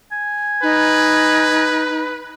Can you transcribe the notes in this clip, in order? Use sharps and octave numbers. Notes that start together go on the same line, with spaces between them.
G#5
D#4 B4